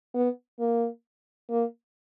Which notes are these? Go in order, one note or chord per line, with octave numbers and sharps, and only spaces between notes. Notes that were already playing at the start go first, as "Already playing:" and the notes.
B3
A#3
A#3